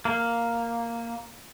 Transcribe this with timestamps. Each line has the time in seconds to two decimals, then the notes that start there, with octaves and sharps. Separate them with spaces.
0.05 A#3